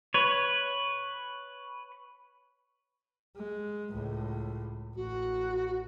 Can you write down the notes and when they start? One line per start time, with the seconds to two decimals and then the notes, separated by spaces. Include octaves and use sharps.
0.14 B4 C#5
3.36 G#3
3.91 C#2 A2
4.95 A1 F#4